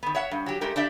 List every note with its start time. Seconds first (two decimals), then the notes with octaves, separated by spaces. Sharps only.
0.03 D#3 B3
0.15 C#5 E5 F#5
0.31 G2
0.46 F#3 G4
0.61 G#3 A3 G4 A#4
0.76 D4 G4 D5 E5